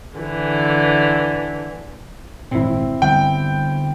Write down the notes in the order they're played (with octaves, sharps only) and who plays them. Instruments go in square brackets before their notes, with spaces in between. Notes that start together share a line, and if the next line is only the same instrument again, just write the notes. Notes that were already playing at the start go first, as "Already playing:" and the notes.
[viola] D3 E3
[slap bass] G#1 A#2 [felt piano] C4 E4
[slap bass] D3 G3 B3 [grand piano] G5